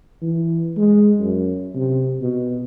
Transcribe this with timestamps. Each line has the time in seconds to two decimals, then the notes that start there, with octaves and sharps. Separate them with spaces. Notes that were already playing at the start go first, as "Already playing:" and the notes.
0.22 E3
0.77 G#3
1.19 F#2
1.75 C3
2.21 B2